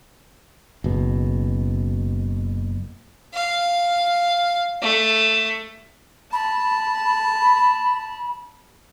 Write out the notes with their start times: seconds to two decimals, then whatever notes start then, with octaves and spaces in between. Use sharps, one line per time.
0.84 F#1 B2
3.33 F5
4.81 A3
6.33 A5 B5